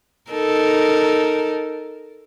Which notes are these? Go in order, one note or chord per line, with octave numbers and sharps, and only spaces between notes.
D#4 A4 A#4